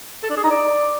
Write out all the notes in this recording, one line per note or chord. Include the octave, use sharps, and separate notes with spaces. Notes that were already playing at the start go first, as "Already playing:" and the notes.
A4
D4
G#4
D#4
D5